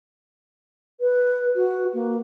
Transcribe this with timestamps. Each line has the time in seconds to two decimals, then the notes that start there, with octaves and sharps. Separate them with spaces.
1.00 B4
1.56 F#4
1.93 A#3